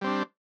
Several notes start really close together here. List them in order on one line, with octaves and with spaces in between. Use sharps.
G3 C4 D4